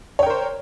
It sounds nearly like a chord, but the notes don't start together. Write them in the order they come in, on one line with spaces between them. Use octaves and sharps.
C#5 G5 A#4 C5